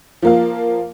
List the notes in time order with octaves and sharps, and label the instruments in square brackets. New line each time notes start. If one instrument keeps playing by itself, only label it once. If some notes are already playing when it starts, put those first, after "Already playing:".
[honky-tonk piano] F3 A#3 F5